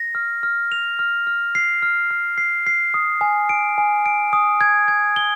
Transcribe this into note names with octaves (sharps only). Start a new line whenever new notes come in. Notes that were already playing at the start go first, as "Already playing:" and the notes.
Already playing: A#6
F6
F6
F7
F6
F6
C7
F6
F6
C7
C7
D#6
G#5
D7
G#5
D7
D#6
G#6
G#6
G7